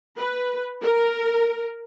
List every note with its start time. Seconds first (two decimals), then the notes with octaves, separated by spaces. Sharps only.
0.17 B4
0.82 A#4